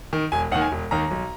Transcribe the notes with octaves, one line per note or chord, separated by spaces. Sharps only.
D#3
E1 G#5
D#2 D#3 F#5
G#5
E1
D#2 D#3 A#5
B1